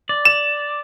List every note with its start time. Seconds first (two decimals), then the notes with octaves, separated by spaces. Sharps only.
0.09 D5
0.25 E7